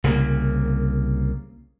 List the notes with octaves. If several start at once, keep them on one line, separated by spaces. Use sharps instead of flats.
C2 C#3 F3 A#3